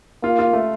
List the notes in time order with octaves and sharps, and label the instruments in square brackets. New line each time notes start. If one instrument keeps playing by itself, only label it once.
[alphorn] A#3 [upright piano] F4
[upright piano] F4
A3